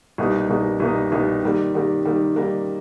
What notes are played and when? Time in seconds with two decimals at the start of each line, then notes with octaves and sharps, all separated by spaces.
0.18 C2 B2 G3 A#3 D#4
0.49 C2 B2 G3 A#3 D#4
0.80 C2 B2 G3 A#3 D#4
1.12 C2 B2 G3 A#3 D#4
1.43 D#3 G3 A#3
1.74 D#3 G3 A#3
2.05 D#3 G3 A#3
2.36 D#3 G3 A#3